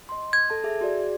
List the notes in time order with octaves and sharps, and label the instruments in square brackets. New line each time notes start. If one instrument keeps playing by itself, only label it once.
[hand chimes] D#5 C6
[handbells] G#6
[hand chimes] A4 A5
G#4 E5
F#4 G#4 D5